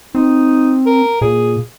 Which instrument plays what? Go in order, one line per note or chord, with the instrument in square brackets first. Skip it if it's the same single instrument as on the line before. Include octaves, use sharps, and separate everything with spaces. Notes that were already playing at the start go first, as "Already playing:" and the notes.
[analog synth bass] C4 [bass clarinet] D#4
[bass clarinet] A#4
[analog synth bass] A#2 [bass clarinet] G#4